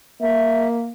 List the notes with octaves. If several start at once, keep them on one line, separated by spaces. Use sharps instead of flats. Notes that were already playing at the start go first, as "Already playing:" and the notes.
A#3 E5